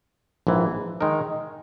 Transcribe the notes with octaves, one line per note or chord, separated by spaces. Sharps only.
A#1 G#2 E3
D#3 G#3 D#4 A#4